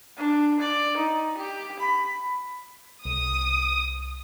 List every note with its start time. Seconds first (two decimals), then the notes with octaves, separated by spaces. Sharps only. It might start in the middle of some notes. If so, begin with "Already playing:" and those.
0.17 D4
0.59 D5
0.97 D#4
1.38 G4
1.79 B5
3.05 C2 D#6